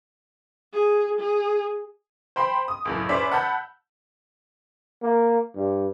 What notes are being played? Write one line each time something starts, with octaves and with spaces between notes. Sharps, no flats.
G#4
G#4
C5 G5 B5 C6
D#6
C#2 F#2 A2
C#4 B4 C5 D5 E5 B6
F#5 A5 B5 E6 G6
A#3
G2